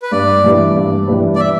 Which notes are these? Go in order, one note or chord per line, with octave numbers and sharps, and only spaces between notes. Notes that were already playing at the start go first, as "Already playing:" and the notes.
B4
G2 D5
E3 G3 D4 B4
G2
E3 G3 D4 B4
D5
E5